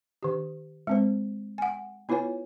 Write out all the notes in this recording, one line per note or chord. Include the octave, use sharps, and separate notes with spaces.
D#3 G4
G#3 C4 C5
F#5 G#5
B3 E4 F4 B4 C#5 G#5